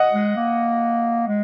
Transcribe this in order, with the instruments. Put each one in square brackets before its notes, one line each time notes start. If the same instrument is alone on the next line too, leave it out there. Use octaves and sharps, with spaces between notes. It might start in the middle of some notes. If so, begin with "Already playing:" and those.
Already playing: [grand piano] D#5 F#5
[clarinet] G#3
A#3
G#3